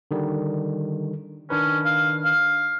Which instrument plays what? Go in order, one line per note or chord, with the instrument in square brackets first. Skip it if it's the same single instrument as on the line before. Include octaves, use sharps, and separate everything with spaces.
[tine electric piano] D3 D#3 G3
[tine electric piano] D#3 D4 B4 [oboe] C#4
[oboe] F5
F5